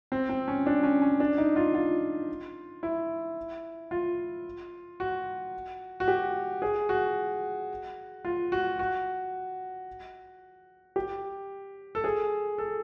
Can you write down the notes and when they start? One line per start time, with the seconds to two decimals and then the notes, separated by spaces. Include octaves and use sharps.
0.12 C4
0.29 C4
0.48 C#4
0.66 D4
0.83 C#4
1.02 C#4
1.20 D4
1.38 D#4
1.56 F4
1.74 F4
2.83 E4
3.91 F4
5.00 F#4
6.00 F#4
6.08 G4
6.62 G#4
6.89 F#4
8.25 F4
8.52 F#4
8.79 F#4
10.96 G4
11.95 A4
12.04 G#4
12.58 A4